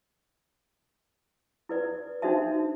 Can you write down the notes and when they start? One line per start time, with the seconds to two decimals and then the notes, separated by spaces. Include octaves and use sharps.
1.69 E4 B4 D5
2.22 D4 D#4 F#4 C5 E5 A5